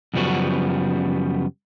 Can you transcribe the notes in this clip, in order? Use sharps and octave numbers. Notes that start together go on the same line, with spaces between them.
F#2 C#3 F3 G3 B3 F#4